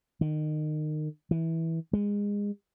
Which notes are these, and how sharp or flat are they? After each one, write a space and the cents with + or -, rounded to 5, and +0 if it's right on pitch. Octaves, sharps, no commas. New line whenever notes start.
D#3 -25
E3 -15
G#3 -25